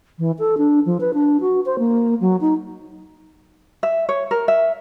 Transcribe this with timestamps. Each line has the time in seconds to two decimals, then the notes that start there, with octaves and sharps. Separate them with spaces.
0.19 E3
0.39 A4
0.58 D4
0.86 F3
1.00 B4
1.14 D4
1.41 F#4
1.66 C5
1.79 A#3
2.21 F#3
2.41 D#4
3.83 E5
4.09 C#5
4.31 A#4
4.48 E5